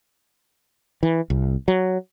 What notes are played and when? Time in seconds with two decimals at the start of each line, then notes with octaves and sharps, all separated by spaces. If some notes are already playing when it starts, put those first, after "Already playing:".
1.03 E3
1.30 C2
1.68 F#3